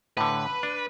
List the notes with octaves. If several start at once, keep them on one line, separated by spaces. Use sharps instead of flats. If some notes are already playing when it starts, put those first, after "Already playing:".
A2 D3 B4
D4